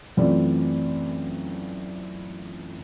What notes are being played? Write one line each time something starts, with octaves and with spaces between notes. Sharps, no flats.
F#2 E3 A3 C4 F4 D5